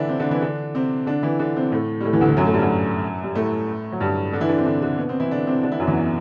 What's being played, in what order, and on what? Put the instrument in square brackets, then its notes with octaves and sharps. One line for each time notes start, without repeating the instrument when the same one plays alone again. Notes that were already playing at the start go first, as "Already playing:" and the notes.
Already playing: [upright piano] D3 E3 D4 E4
C3 C4
D3 D4
E3 E4
D3 D4
C3 C4
D3 D4
E3 E4
D3 D4
C3 C4
A2 A3
G3
A2 A3
E2 E3
D2 D3
E2 E3
F#2 F#3
A2 A3
G2 G3
F#2 F#3
G3
A2 A3
F#3
G2 G3
D3 D4
E3 E4
D3 D4
C3 C4
D3 D4
D3 D4
B2 B3
C3 C4
E3 E4
D3 D4
C3 C4
D3 D4
E3 E4
F#2 F#3
E2 E3
B2